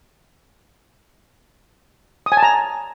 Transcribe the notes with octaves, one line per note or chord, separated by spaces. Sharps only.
D#6
G#5
A5
A#5